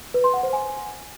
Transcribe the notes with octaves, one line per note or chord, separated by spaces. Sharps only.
B4
C6
F#5
C5
G#5